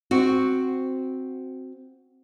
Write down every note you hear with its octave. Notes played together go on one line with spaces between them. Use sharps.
C4 F#4